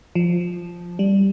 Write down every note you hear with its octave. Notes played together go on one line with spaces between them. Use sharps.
F3
G3